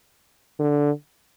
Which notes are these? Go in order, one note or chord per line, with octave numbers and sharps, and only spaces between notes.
D3